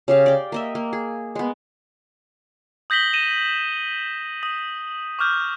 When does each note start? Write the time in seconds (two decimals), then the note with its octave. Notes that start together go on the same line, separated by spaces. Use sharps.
0.08 C#3 G4 F5
0.26 D5 G5
0.52 A#3 D#5 E5
0.75 A#3
0.93 G#4
1.35 G#3 B3
2.90 D#6 G6 A#6 B6 F#7 G7
3.13 A#6 D#7 E7
4.42 D#6 A#6
5.19 C#6 D6 F6 G6